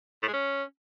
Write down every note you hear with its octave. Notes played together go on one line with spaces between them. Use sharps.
A2
G#3
C#4